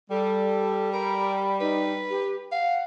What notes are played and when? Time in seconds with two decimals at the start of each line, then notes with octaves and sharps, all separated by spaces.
0.10 G3 A4
0.93 A#4 B5
1.61 D#4 B4
2.10 G4
2.52 F5 F#5